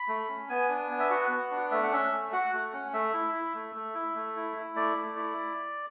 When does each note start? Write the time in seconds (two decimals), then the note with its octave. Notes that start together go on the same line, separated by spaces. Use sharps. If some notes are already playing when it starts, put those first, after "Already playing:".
Already playing: B5
0.08 A3
0.29 C#4
0.49 B3 G#5
0.69 D4
0.91 B3
1.00 E5
1.10 F#4 F#5
1.30 B3
1.51 D4
1.71 A3 E5
1.83 F#5
1.92 C#4 E5
2.13 A3
2.33 F#4 F#5
2.53 A3
2.73 C#4
2.93 A3 E5
3.14 E4
3.33 E4
3.55 A3
3.75 A3
3.95 E4
4.15 A3
4.36 E4
4.56 E4
4.76 A3 D5
4.97 A3
5.16 E4